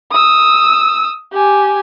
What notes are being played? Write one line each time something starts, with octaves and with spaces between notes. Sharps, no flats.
D#6 E6
G4 G#5